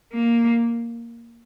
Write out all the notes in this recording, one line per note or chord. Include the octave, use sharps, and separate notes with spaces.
A#3